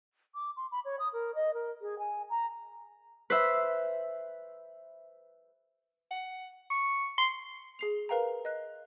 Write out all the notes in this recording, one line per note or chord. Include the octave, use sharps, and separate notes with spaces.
D6
C6
B5
C#5
D#6
A#4
D#5
A#4
G#4
G#5
A#5
B4 C5 E5
F#5
C#6
C6
G#4 C7 F7
A#4 B4 F5 G5 A#5
D#5 F#6